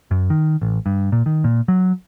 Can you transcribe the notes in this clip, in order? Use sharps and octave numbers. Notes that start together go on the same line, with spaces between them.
F#2
D#3
A1
G2
A#2
D#3
A#2
F#3